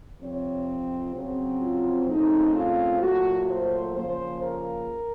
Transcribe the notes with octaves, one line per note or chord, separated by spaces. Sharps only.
F2 C3 F3 C4 C#5
C#3 F#3 C4
F4
C#3 A3 C4 D#4
F4
A#2 F#3 A3 F#4
C5
C#3 F3 A#3 C5
A#4